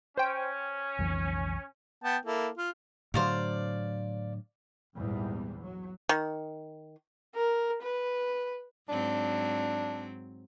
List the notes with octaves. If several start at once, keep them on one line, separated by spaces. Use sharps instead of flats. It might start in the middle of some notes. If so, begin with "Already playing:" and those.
C#4 C5 G5
B1 F2 E3
B3 G5 A5
A#3 E4 A4
F4
A2 D3 F#3 C5 D5 F5
A#1 E2 G#2 E3 G3
F#3
D#3
A#4
B4
G#2 F#3 C4 D4